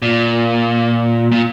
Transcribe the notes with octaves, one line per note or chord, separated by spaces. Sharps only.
A#2
A#2